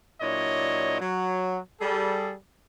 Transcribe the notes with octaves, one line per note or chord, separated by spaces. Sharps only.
A#2 F#3 D4 E4 C#5 D#5
F#3
G3 G#4 A4